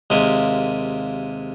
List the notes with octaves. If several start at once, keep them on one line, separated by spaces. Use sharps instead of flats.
D#2 C3 G#3 A#3